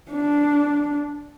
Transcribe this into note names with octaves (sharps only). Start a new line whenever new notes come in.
D4